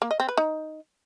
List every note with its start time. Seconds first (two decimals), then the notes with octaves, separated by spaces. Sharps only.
0.02 A#3
0.11 D#5
0.20 C4
0.29 B4
0.37 D#4